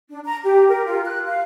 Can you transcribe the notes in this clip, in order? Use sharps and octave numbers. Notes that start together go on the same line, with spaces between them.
D4
A#5
G4
A#4
F4
F#6
F5